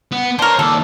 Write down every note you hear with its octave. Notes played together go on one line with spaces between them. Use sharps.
B3
D4 A#4 C5 C#5
D#2 A4 D5